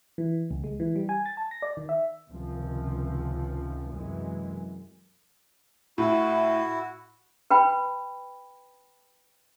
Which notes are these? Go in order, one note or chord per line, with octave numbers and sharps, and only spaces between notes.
E3
C#2
G#3
E3
G3
G#5
A6
A5
A#6
D5
D#3
E5
C#2 C3 D#3 F3
F#2 C3 E3 G#3
A2 E4 F#4
B4 G5 B5